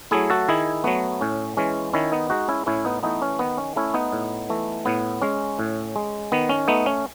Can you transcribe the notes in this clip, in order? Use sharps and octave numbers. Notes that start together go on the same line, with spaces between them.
F#3 A3 E4 G#4
F#4 A4
D#3 E4 G#4
F#3 A3 B3
A2 C#4
E3 G#3 C#4
D#3 C#4 E4
B3 D#4
G#3 D#4 F#4
C#4 E4
A2 C#4 E4
B3 D#4
E3 A3 B3 D#4
C#4
D#3 B3
C#4
A3 C#4 E4
B3 D#4
A2
E3 A3
A2 B3
G#3 C#4
A2
G#3
D#3 B3
C#4
A3 B3 D#4
C#4